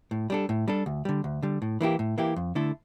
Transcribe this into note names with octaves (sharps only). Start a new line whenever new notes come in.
A2
G3 D4 A4
A2
G3 D4 A4
D2
D3 G3
D2
D3 G3
A2
E3 A#3 E4 G4
A2
E3 A#3 E4 G4
F2
D3 A3 E4 A4